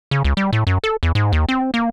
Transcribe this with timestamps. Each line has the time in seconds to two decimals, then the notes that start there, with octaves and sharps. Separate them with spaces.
0.11 C#3
0.24 C#2
0.37 G3
0.53 A2
0.67 F#2
0.84 A4
1.03 E2
1.15 G#2
1.32 D#2
1.49 C4
1.74 A#3